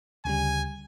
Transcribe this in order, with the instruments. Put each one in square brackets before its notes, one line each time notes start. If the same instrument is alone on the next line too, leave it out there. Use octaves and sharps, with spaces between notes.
[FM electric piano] D2 C#3 G3 [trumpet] G#5